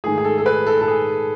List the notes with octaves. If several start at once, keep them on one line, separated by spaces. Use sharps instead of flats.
G#2 D#3 A3 G#4
G#4
A4
A4
B4
A4
A4
G#4